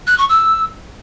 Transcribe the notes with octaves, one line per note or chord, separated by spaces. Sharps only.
F#6
C#6
E6